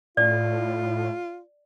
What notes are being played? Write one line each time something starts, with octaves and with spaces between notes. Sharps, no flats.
A2 F4 D5